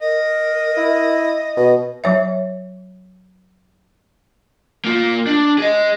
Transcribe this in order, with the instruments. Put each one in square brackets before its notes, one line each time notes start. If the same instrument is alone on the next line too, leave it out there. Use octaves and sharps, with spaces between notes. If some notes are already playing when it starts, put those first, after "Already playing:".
[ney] A#4 [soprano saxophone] D#5
[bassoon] E4
B2
[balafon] F#3 C#5 E5
[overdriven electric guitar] A#3 F4
D4
G#4 D#5